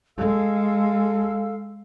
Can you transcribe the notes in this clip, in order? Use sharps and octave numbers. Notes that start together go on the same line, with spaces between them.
G#3 A4 F5 E6